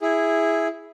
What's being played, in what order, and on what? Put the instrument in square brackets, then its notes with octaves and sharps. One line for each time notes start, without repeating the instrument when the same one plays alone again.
[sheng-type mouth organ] E4 G#4